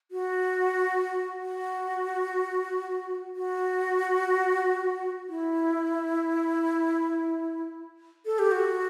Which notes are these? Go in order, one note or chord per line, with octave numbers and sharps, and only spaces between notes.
F#4
F#4
F#4
E4
A4
G4
F#4